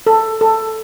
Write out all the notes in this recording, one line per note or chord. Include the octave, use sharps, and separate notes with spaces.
A4
A4